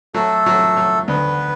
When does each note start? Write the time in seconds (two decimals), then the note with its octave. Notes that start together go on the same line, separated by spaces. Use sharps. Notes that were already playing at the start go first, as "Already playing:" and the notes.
0.14 F#3 A3 A4
0.46 F#3
0.77 F#3
1.08 D2 B3 B4